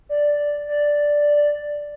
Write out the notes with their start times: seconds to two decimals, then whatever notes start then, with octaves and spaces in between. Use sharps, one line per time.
0.09 D5
0.68 D5